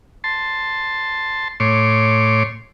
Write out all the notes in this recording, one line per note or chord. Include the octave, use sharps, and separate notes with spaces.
A5 C6
A2 C#5 C6 D6